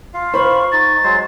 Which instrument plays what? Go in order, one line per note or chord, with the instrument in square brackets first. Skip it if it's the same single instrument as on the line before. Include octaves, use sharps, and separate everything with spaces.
[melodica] F4 F5
[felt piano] C5 [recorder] B5 [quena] C#6
[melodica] D#4 [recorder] A6
[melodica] F#3 G#3 C5